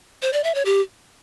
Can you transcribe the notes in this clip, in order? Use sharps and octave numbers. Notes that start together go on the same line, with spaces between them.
C5
D5
E5
C#5
G4